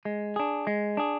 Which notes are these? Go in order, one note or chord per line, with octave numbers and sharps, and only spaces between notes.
G#3
D4 G#4
G#3
D4 G#4